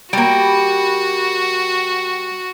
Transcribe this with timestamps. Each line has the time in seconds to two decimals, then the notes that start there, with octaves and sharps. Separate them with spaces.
0.13 G3 A#3 F#4